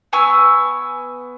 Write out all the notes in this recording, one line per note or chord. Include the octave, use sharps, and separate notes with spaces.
B3 G#5 C#6 E6